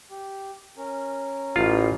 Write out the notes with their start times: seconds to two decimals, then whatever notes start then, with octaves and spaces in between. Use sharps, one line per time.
0.11 G4
0.77 C#4 A#4
1.56 A1 F4